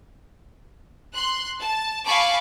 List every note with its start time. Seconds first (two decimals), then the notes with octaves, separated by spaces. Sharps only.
1.13 C6 F#6
1.60 A5
2.06 F5 G#5 A5 B5 C#6 D6